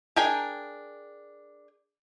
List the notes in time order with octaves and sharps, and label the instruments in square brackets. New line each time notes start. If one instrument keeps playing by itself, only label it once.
[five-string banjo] D4 G#4 A#4 G5 G#5